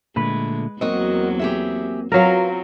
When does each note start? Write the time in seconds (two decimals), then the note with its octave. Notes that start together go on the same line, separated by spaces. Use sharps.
0.16 A#2 D3 G#3 A3 B4
0.81 E2 F#3 A#3 C4 F#4 A#4 D#5
1.39 G4 G#4 E5
2.12 F#3 C4 F4 F#4 A#4 B4 F5